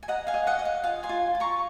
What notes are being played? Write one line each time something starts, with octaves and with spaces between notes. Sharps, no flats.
G#5
D#5 F#5 A#5
F5 G#5
D#5
D#5 F#5
D#5
F5
F4 F5 G#5
G#5 C6
F4
F4
A#5 C#6